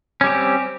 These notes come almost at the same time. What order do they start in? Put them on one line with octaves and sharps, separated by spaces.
C#4 G3 G4 C4